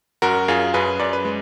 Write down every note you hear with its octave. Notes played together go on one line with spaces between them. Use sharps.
F#2 F#4 A#4
F#2 F4 G#4
F#2 G#4 B4
F#2 D5
B4
G#3